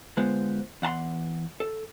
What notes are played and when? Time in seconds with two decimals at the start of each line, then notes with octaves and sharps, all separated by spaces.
0.17 D3 G#3 B3 F4 C5
0.82 E2 F#5 A5 C6
1.60 A4